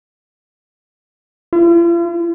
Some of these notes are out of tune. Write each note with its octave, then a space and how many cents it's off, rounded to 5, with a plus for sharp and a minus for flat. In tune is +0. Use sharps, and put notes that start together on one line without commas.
F4 -45